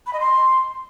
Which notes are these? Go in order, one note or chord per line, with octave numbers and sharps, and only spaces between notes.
B5
D#5
C6